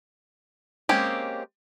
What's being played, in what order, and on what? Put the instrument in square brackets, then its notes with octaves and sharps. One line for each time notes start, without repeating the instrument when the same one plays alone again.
[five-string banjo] G#3 A#3 C4 C#4 G4